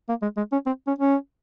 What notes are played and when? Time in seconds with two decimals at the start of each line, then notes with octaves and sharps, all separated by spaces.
0.09 A#3
0.22 G#3
0.37 G#3
0.52 C#4
0.66 C4
0.87 C#4
0.99 C#4